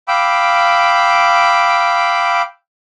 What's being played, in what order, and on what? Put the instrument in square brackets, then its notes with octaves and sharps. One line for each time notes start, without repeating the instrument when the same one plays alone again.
[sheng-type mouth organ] F5 G5 B5 D6 E6